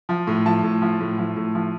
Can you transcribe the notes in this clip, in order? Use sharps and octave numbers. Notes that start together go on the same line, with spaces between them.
F3
A2
F3 A5
A2
F3
A2
F3
A2
F3